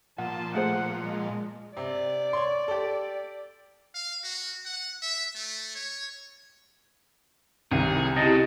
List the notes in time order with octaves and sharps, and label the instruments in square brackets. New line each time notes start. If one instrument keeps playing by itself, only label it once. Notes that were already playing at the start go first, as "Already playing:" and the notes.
[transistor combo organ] A#2 F3 [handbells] F#5 [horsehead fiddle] A5
[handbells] A3 G#4 C5 [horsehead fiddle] F#5
[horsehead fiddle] G#3
[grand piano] C3 [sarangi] D5
[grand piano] C#5 C6
G4 A4
[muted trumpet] F5
F#4
F#5
E5
A3
C#5
[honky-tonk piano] C2 D#3 [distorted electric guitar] G#4
[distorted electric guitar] C#3 [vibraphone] C4 E4 G4 [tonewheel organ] D#5 A5 A#5